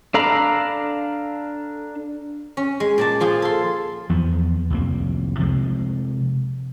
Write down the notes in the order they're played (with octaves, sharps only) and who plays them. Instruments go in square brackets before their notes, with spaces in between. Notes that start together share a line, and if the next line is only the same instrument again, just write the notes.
[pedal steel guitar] D4 A4 F5 A#5 B5
[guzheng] C#4
G#3
A#2 D5 A5
F3 F4 G#4
A4 C6
[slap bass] E2 F3 B3
C2 F2 A#3
C3 F3 G#3